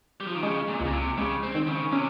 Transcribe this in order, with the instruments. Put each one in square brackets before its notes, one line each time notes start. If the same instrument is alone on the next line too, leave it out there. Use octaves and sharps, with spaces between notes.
[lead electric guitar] G3
F3
D#3
[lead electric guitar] C#3 [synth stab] G#3
[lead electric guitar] A#2
[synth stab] C#2
[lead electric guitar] A#2
C3
[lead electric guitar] C#3 [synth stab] G#3
[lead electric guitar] C4
[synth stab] D#3
[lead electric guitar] C#3
[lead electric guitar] C3 [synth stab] C#4